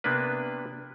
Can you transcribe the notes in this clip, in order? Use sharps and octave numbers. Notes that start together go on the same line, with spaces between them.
C3 A#3 B3 D4 B4